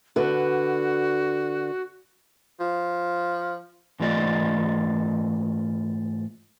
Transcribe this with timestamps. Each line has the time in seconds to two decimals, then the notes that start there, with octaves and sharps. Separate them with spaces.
0.16 D3 F#4 B4
2.60 F3
4.00 G#2 E3 A3 F4 D5 D#5